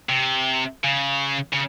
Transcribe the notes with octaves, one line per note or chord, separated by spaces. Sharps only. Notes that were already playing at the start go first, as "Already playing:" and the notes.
C3
C#3
C#3